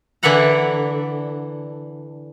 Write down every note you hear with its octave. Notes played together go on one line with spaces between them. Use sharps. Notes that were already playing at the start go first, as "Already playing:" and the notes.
D3 E3 D5 E5 F#5 A#5